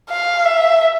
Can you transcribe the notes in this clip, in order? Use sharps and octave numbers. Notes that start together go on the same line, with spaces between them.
F5
E5